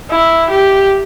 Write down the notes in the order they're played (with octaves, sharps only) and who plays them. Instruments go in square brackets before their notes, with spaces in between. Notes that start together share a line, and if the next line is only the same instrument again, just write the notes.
[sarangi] E4
G4